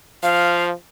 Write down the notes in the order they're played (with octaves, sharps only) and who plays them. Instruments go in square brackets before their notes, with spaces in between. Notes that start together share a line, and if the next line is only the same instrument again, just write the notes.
[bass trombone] F3 [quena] F5